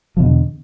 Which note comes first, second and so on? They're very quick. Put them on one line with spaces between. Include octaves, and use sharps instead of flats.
F3 B2 E2 D3